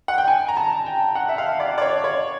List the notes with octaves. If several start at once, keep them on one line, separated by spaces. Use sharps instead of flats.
F#5
G5
G#5
A#5
A5
G5
F#5
E5
F5
D5
D5
C#5
C#5